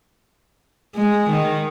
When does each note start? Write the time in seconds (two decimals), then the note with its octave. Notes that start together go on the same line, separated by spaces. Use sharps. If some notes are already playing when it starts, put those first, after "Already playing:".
0.95 G#3
1.30 D#3